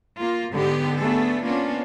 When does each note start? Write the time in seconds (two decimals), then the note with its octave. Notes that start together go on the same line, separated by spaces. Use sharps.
0.18 A#3 F4
0.52 G#2 D3 B3 G4
0.98 A3 B3 D4 G#4 A4
1.45 A#3 B3 C#4 D4 F4